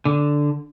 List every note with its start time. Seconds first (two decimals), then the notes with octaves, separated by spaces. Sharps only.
0.05 D3